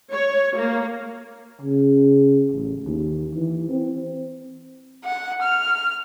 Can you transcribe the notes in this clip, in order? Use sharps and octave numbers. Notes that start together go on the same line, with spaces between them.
C#5
A#3
C#3
A1
D#2
E3
C4
F#5
F6